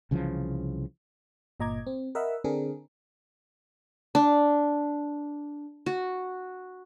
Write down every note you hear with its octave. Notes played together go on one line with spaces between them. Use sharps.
C2 C#3 E3 F3
G1 A#2 D#5 A#5 D6 G#6
C4
A#4 D#5 E5 F#5 B5 E6
D3 C4 D4 G#4 A#4
D4
F#4